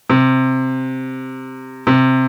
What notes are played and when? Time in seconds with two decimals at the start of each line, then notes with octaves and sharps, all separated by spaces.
0.10 C3
1.87 C3